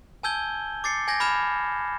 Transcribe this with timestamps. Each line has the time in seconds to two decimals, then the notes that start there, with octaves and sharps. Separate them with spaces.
0.23 G#5 A5 E6 G6 G#6 G7
0.84 D6 A6 C7 C#7
1.08 G#5 G6 G#6 A#6
1.20 B5 D6 F6 G#6 E7